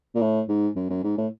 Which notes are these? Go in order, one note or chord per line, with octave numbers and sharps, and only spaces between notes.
A#2
A2
G#2
F#2
F#2
G#2
A2